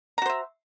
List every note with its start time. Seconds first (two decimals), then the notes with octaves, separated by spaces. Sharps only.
0.18 A#5
0.22 F#4
0.26 C5
0.30 E5